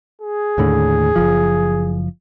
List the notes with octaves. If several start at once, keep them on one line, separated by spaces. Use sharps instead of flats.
G#4
D#2 A2 D3
F#1 B1 F3